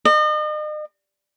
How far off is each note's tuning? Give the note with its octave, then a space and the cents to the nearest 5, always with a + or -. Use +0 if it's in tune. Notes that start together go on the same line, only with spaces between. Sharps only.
D#5 -40